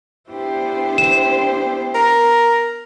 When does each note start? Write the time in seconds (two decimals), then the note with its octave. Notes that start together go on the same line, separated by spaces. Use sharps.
0.29 B3 D4 E4 G4 C5
0.98 E7
1.95 A#4